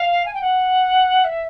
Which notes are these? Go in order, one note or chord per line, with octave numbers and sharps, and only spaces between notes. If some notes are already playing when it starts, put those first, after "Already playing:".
Already playing: F5
G#5
G5
F#5
E5